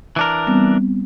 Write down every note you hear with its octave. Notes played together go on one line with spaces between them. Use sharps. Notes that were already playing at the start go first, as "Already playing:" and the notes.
E3 D4 A#4
G3 B3 C4